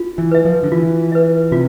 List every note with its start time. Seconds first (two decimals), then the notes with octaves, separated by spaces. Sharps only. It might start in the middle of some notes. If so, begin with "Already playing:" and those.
Already playing: F4
0.18 E3
0.31 B4 E5
0.45 F3
0.63 D3
0.72 E3 F4
1.12 B4 E5
1.52 C3 F4